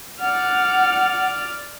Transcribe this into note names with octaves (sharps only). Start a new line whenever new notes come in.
D5 F#5 F6